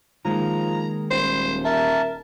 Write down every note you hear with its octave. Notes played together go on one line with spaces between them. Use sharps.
D#3 F3 G#3 A#3 A#5
D#1 C5
A#4 E5 A5